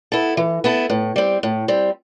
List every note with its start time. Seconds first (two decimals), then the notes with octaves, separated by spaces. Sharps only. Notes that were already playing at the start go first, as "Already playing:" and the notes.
0.12 B3 E4 A4
0.37 E3
0.64 B3 E4 A4
0.90 A2
1.16 G3 C4
1.43 A2
1.68 G3 C4